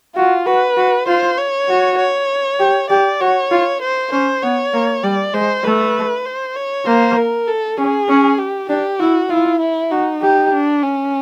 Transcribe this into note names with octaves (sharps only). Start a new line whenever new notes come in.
F4 F#4
F#4 B4
F#4
F4 C5
C#5
F#4
C#5
G4
G4 D5
F#4 C#5
F4
C5
C#4 C5
B3 C#5
A#3
G3 D5
G#3 C5
A3 B4
C5
C#5
A#3 C5
A#4
A4
C#4 G#4
C#4
G4
D4 G4
E4 F#4
E4 F4
E4
D#4 F#4
G4
D4
C#4